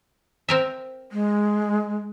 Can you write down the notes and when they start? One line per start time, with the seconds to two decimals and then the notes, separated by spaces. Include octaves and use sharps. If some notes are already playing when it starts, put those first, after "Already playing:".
0.49 C4 A#4 E5
1.12 G#3